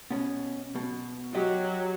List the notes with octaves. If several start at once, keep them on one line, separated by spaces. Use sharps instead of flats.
B2 C#4
B2
F#3 G4 D#5